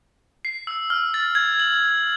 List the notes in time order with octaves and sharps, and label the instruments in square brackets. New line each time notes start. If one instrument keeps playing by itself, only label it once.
[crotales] C7
E6
F6
A6
G#6
F#7